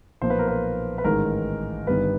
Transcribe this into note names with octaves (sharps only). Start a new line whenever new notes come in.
B1 A#2 F3 A#3 C5
B4
A#4
B4
B4
A1 G#2 D#3 G#3 A#4
G1 G2 D#3 G3 B3 B4